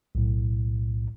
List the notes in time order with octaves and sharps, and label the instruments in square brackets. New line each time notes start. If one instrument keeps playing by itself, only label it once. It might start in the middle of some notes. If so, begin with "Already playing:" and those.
[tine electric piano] B1 A2